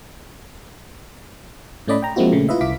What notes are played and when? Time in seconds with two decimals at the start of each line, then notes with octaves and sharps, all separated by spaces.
1.88 A2 A3 C#4 D5 D#5 B5
2.02 G5 A#5
2.16 F3 G#3 A#3 C4 E4 F#4
2.32 A#2 C#3 A3
2.49 E4 F4 B4 D#5 E5
2.61 C2 E4 F5 D6 B6